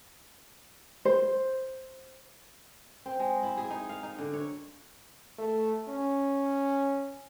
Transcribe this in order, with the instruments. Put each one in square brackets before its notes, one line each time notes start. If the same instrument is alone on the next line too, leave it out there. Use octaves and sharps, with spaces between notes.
[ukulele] C5
[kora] C4
G#3
E4
G#4
D#4
F5
D#4
D3
C#5
[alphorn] A3
C#4